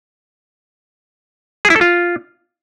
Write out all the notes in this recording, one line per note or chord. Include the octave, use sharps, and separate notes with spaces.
G#4
E4
A4
F4